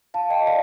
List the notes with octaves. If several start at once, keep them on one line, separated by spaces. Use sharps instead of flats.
F5 A5
D#5 G5
D5 F5